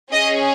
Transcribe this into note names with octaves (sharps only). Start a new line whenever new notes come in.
C#4 G#4 D#5